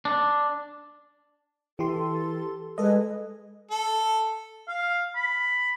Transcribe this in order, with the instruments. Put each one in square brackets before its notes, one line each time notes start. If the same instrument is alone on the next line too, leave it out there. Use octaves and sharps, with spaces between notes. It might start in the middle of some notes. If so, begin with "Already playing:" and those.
[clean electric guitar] D4
[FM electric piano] E3 G4 C6 [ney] A4
[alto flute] G#3 [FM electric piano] A4 D#5 [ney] B4
[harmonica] A4
[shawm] F5
B5